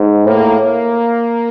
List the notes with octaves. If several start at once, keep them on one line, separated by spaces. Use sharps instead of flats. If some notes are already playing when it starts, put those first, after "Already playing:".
Already playing: G#2
A2 A#3
A#3